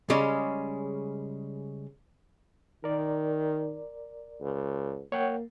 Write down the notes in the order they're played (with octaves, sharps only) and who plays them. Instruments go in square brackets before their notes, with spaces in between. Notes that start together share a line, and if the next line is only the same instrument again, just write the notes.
[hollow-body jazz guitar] C#3 G3 G#3 C#4
[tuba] D#3 [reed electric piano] A#4 D5
[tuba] C#2
[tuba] A#3 [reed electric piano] C#5 F#5 G5